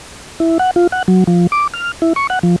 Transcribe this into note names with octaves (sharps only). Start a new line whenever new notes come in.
E4
F#5
F4
F#5
F#3
F3
D6
F6
E4
C#6
F#5
F3